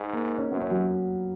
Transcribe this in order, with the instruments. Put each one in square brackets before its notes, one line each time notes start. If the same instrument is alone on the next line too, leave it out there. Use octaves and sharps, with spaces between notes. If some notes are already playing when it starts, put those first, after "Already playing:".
Already playing: [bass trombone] G#2
[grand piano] A#3
C#4
[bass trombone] F#2 [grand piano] B3
[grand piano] C#4
F#3